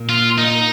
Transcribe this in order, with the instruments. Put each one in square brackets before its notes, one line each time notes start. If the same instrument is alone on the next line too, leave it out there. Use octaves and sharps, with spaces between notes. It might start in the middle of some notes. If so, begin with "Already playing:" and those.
Already playing: [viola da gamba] A#2
[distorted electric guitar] F4
D#4